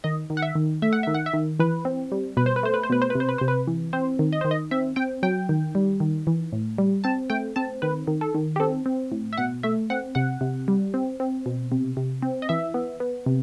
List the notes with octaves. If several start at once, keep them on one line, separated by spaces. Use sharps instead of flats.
D#3 D#5
D#3
F#5
E5
D#3
A3 E5
F#5
D#3 E5
F#5
E5
D#3
E3 B4
C4
G3
B2 B4
C5
B4
A3 C5
B4
C5
B2 B4
C5
B4
C3
C5
B4
C3 C5
B4
E3
C4 C5
D#3
D#5
D#3 C5
D#5
C4 E5
C4 G5
F#3 G5
D#3
G3
D#3
E3
A2
G3
C4 A5
A3 G5
C4 A5
D#3 B4
D#3
A4
D#3
G4
C4 A4
C4
A2
E5
B2 F#5
A3 E5
C4 F#5
C3 F#5
C3
G3
C4
C4
B2
C3
C3
C4
D#5
E3 E5
B3
B3
C3